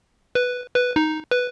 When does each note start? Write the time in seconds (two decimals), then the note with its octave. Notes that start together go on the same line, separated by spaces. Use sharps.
0.35 B4
0.75 B4
0.96 D#4
1.31 B4